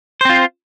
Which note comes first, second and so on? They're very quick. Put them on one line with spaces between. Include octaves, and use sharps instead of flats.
C5 C4 F4